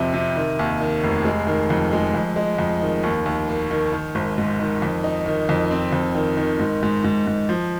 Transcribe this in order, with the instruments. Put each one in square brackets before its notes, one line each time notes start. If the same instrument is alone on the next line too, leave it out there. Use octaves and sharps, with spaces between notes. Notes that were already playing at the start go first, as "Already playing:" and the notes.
Already playing: [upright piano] F2 C3 C4
C3
D#3
D#2
D#3
F1
G#3
D#3
F2
G#3
F2
G#3
F2
D#3
D#2
D#2
A#3
D#3
D#3
G#1
G#2
D#3
F2
D#4
D#3
F2
C4
F2
D#3
D#3
G#2
G#2
G#2
G#2
F3